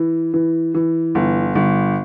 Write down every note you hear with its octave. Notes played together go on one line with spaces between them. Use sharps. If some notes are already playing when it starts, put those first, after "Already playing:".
Already playing: E3
E3
E3
G1
G1